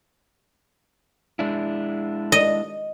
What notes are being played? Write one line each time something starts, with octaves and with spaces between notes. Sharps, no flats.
G#3 D4 E4
D#5